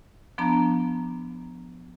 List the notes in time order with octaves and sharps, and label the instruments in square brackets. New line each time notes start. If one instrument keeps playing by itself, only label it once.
[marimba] F3 B3 D4 A5 A#5